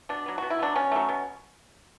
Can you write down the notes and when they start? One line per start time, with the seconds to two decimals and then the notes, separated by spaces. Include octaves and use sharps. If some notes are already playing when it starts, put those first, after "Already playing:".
0.09 B2 D4
0.26 F#3 B3
0.38 B2 F#4
0.50 E4
0.59 F#3 B3 D4
0.75 B2 C#4
0.92 F#3 A3
1.09 B2